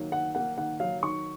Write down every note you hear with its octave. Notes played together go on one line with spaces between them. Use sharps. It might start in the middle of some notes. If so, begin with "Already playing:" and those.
Already playing: D#3 F#3 A#3
D#3 F#5
A#3 F#5
D#3 F#5
F#3 F5
D#3 C#6